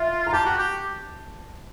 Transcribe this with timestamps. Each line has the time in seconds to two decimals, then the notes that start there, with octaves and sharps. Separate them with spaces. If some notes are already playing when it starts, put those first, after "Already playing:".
Already playing: F4 E5
0.26 A#5
0.33 G4 A5
0.46 F#4
0.58 G4